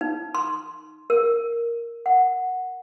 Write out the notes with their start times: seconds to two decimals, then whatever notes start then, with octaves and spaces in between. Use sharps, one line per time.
0.01 D#4
0.35 C6
1.10 A#4
2.06 F#5